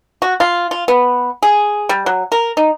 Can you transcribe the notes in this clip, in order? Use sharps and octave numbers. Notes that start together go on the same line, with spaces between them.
F#4
F4
F4
B3
G#4
G3
F#3
A#4
D#4